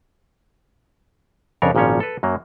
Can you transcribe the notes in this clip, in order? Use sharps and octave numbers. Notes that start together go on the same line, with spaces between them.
F2 C#3 D4 A#4 C#5
G#1 A#2 F3 C#4 C#5
A4 B4
F#2 F#3 A#3